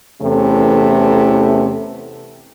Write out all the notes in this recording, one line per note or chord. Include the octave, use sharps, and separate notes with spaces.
E2 C3 E3 A3 C#4 A4